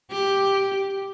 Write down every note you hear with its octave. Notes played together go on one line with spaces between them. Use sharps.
G4